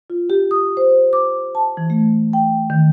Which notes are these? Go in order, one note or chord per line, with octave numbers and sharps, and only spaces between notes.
F4
G4
D#6
C5
D6
A5
E3
A3
G5
D#3